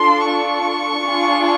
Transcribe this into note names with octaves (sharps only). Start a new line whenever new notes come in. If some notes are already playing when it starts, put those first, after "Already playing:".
Already playing: D4 F4 A4 C6
C#6
D4 F4 G#4